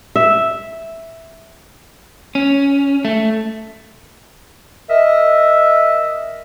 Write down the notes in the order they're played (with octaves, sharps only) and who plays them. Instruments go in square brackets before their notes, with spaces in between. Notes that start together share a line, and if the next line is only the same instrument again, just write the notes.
[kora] E5
[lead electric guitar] C#4
A3
[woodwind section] A#4 D#5 E5